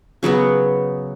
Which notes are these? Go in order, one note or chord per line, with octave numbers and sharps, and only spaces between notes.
C#3 F#3 B3 F#4